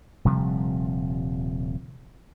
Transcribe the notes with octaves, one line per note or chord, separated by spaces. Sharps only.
D#1 C3 F3 G3